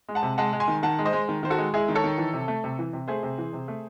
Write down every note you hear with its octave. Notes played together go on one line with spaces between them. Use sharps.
G#3
F#5 A5
C3
G#3 F#5 A5
G#3
G#5 C6
D#3
D#3 F#5 A5
G#3
C5 D#5
G#3
D#3
D#3 C5
F#4 A4
G#3
G#3 E4 G#4
D#3
A4 C#5
D#3
E3
C3
A3
C3
E3
C3
A3 G#4 C5
C3
E3
C3
A3